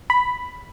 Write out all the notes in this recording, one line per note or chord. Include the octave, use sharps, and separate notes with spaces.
B5